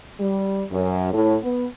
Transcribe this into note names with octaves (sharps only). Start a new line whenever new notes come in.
G3
F#2
A2
B3